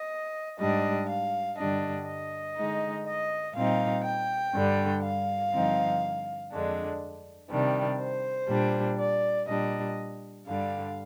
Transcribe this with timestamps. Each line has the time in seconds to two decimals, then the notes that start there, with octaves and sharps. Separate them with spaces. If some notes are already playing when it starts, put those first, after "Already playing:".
Already playing: D#5
0.59 G#2 G3 D4 D#5
1.08 F5
1.57 G2 D3 G3 D4 D#5
2.07 D#5
2.57 D3 G#3 D#4
3.06 D#5
3.55 A#2 G3 C4 D#4 F5
4.05 G5
4.54 G2 D3 G3
5.03 F5
5.52 G2 D3 F3 C4 D#4
6.52 F2 D3 G#3 D4
7.50 C3 D#3 G3 D4
7.99 C5
8.49 A#2 G3 D4
8.98 D5
9.47 A#2 G3 D4 D#5
10.46 G2 D3 G3 F5